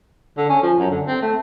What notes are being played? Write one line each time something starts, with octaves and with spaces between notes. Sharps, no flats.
D3
C#4
F3
F#2
D3
C4
A3